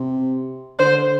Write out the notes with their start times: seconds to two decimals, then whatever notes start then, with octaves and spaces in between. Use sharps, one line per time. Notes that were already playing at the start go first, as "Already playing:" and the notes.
Already playing: C3
0.79 D3 C5